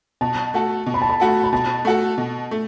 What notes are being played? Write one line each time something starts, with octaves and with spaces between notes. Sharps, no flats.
B2 A5
A3 F#4 A4
B2
B5
A5
B5
A3 F#4 A4
B5
B2 A5
A3 F#4 A4
B2
A3